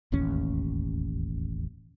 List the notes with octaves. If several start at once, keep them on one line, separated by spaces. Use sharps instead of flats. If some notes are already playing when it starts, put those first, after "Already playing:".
E1 A1 D#2 C#4